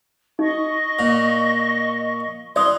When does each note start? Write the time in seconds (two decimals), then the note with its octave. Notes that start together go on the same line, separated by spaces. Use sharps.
0.39 D#4 D#5 C#6
0.99 A#2
2.56 E3 D5 C6 D#6